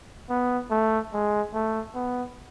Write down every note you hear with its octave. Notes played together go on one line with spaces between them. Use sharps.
B3
A3
G#3
A3
B3